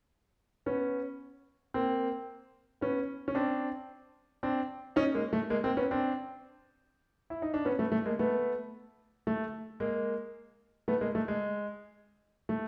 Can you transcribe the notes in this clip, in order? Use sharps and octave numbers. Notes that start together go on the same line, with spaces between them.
B3 C#4
A#3 C4
B3 C#4
C#4
C4 D4
C4 D4
C#4 D#4
G#3 A#3
A3
G#3 A#3
A#3 C4
B3 C#4
C4 D4
E4
D#4
D4
B3 C#4
A3 B3
A3
G#3 A#3
A3 B3
A3
G#3 A#3
A3 B3
G#3 A#3
A3
G#3
A3